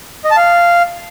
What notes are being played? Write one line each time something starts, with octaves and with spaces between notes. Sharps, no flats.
D#5
A5
F5